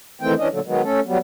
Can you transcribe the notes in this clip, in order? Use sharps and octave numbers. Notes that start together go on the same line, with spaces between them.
D2 D#3 E3 A3 C4 G5
E3 C#4 D4 D#5
A#2 D3 F#3 A3
D#3 F#3 G#3 B3
A3 C#4 A4
F#3 G3 B3